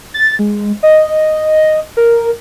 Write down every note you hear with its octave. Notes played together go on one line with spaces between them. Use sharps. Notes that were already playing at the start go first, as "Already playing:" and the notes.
A6
G#3
D#5
A#4